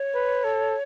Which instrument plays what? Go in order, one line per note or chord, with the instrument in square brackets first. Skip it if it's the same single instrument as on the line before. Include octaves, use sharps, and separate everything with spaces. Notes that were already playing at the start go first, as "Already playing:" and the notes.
Already playing: [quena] C#5
[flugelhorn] B4
A4